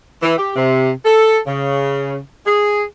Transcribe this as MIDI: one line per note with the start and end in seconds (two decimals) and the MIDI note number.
0.23 0.37 52
0.38 0.53 67
0.56 0.90 48
1.05 1.40 69
1.47 2.18 49
2.46 2.83 68